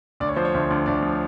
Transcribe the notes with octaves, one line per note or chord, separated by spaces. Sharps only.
D2 D5
C#5
F3 C5
C#5
D2
D2
D2 D5
F3